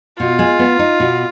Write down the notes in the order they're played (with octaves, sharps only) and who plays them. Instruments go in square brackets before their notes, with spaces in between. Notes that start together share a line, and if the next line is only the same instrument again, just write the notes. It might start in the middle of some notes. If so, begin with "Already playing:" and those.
[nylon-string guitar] B2 [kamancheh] F4
[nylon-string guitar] G#3
B3
D#4
B2